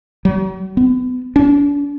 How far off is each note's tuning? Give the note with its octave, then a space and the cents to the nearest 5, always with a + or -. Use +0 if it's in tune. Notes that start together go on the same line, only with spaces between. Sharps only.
F#3 +40
B3 +35
D4 -40